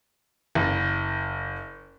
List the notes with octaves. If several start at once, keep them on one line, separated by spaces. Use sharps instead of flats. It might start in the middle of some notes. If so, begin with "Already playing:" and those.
F#1